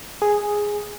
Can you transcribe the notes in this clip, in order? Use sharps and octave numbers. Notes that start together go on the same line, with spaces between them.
G#4